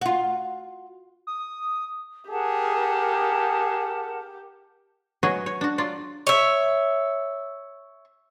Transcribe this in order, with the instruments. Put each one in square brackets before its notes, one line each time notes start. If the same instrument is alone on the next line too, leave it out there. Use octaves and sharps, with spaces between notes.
[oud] F4 F#4
[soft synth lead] D#6
[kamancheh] G4 [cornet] G#4 [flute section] A#4 F#5 A5
[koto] F#3 B3 F#4 G#4 C#5 D#5
C#5
D4 F#4
F#3 F4 D5
[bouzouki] C#5 E5